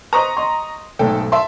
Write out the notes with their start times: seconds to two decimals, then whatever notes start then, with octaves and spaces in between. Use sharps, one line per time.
0.13 B4 C5 D#5 A#5 C#6 D#6
0.37 D#5 C6
0.99 B1 G#2 A3 A4 G5
1.32 E5 A5 C6